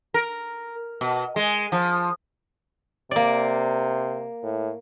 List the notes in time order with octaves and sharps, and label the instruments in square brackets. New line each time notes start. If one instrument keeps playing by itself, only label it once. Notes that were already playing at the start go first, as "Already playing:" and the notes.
[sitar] A#4
B2
G#3
F3
[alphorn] C3 [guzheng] A#3 D5
[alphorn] A2